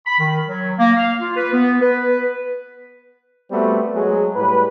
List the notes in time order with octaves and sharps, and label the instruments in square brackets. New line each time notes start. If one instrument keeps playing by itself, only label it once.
[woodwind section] B5
D#3
F#3
A#3
F5
F4
B4
B3
B4
[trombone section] G3 A3 B3 C4 F#4
F#3 G#3 G#4
A2 G3 B4